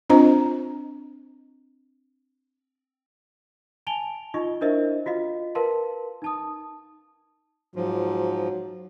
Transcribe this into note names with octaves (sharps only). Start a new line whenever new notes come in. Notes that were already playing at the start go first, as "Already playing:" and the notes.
C4 D4 F4 C5 D#5 A#5
G#5 A5 D7 F7 G7
D#4 F4 D#5 C#6
D4 E4 A#4 C5 D#5 E5
F4 F#4 D#5 F5
A#4 B4 F5 A5 C6
D#4 A5 D#6
G#2 F3 F#3